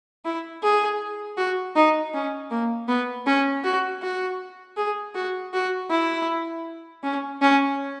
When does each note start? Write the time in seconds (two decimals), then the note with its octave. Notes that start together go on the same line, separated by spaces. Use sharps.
0.25 E4
0.63 G#4
1.37 F#4
1.76 D#4
2.14 C#4
2.51 A#3
2.88 B3
3.26 C#4
3.64 F#4
4.02 F#4
4.77 G#4
5.15 F#4
5.53 F#4
5.90 E4
7.03 C#4
7.42 C#4